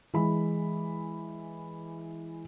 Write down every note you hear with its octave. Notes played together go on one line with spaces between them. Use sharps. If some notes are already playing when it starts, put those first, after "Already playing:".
E3 G#3 B5